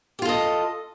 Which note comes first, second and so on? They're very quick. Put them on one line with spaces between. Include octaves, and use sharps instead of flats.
G4 F4 A4 D#5